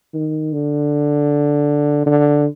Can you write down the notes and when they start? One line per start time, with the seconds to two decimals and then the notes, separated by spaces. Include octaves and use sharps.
0.14 D#3
0.53 D3
2.06 D3